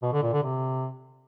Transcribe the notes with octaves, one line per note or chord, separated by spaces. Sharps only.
B2
D3
A#2
D3
C3